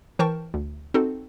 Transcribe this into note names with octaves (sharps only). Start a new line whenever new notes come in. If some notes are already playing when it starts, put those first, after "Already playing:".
E3 A#4 C5 G5 A5 C#6
D2
C4 D#4 F#4 A4